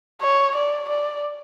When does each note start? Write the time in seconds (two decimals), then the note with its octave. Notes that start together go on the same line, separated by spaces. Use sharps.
0.22 C#5
0.56 D5
0.89 D5